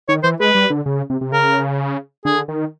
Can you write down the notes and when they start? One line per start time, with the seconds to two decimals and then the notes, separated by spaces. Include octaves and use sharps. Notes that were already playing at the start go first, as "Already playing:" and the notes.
0.08 D#3 C#5
0.23 E3 C5
0.40 G#3 B4
0.55 G3
0.70 D3
0.86 C#3
1.10 C3
1.21 C3
1.32 C#3 A#4
2.25 D3 G#4
2.48 D#3